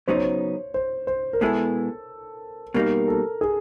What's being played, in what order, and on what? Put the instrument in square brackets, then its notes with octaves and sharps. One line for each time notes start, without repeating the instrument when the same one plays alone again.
[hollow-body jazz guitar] C#3 F#3 B3 D#4 [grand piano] C5
[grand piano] C#5
C5
C5
C5
A#4
[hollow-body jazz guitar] B2 G#3 B3 E4 G#4 [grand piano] A4
[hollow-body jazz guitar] B2 G3 A#3 D#4 [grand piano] A#4
[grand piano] A4
G#4